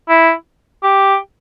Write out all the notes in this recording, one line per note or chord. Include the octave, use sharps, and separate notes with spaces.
E4
G4